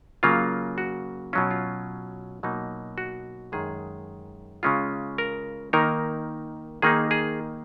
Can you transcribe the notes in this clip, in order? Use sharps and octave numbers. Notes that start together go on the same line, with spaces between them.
C#3 F#3 A#3 F4
F#4
B2 F#3 C#4 F4
F4
B2 F#3 A#3 D#4
F#4
F#2 D#3 G#3 G#4
C#3 G#3 C#4 F4
A#4
D#3 A#3 D#4 A#4
D#3 A#3 D#4 G#4
G#4